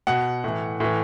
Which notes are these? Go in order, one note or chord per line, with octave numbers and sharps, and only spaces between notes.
B2 F#5
A2 E3
A2 E3